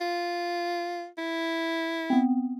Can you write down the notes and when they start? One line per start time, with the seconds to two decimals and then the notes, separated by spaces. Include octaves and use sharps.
0.01 F4
1.18 E4
2.10 B3 C4